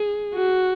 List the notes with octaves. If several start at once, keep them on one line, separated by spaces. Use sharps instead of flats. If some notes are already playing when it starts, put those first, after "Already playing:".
Already playing: G#4
F#4